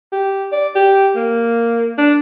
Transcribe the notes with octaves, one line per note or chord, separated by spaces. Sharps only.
G4
D5
G4
A#3
D4